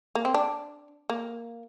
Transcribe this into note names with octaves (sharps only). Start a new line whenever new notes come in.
A#3
C4
D4
A#3